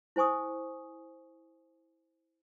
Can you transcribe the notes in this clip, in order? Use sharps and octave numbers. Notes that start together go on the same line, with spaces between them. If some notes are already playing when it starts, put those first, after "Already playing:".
E4 C5 G#5 C#6 D#6